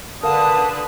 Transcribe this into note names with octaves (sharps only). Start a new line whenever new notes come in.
D3 A#4 B4 F5 F#5 A5 D#6